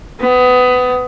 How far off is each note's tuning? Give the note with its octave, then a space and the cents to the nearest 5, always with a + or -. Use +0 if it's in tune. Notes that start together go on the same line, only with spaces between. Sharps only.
B3 +25